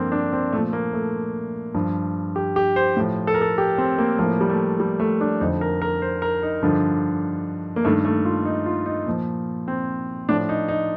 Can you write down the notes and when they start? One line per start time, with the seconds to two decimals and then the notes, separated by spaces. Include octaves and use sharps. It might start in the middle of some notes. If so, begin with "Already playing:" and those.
Already playing: G2 D3 F3 A#3 C4
0.12 D4
0.33 C4
0.53 A#2 F3 A3
0.73 A#3
0.93 A3
1.75 G2 F3
2.36 G4
2.56 G4
2.76 C5
2.97 A2 F3
3.27 A4
3.34 A#4
3.42 A4
3.58 G4
3.78 C4
3.98 A#3
4.19 A2 F3 A#3
4.41 G3
4.50 A3
4.80 G3
5.00 A3
5.21 D4
5.41 F2 D3 F3 D#4
5.61 A#4
5.82 A#4
6.02 C5
6.22 A#4
6.43 D#4
6.62 G2 D3 F3
7.76 A#3
7.85 G2 D#3 A3
8.05 A3
8.25 F4
8.45 D#4
8.66 F4
8.86 D#4
9.06 A#2 F3
9.68 C4
10.29 A2 F3 D4
10.49 D#4
10.68 D#4